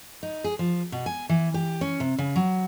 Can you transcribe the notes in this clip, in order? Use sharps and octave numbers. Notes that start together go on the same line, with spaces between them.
D#4
G#4
F3
B2
G#5
E3
G4
C#4
C3
C#3
F#3